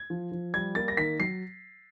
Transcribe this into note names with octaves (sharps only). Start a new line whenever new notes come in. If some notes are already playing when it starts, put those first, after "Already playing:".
Already playing: G#6
F3
F3
G3 G#6
A#3 A6
A#6
D#3 B6
F#3 C7